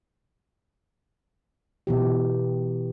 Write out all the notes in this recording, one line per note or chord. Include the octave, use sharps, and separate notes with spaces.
B2 E3 G4